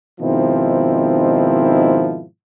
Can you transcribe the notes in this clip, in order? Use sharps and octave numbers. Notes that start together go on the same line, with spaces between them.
G#2 B2 D#3 F3 C4 E4